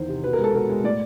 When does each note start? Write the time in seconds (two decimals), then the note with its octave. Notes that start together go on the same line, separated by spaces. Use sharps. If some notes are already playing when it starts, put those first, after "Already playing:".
Already playing: E2 D#3 C5
0.08 C3
0.24 B2 B4
0.33 A#4
0.39 G#3
0.44 A4
0.54 B2 A#4
0.70 G#3
0.84 A2 D5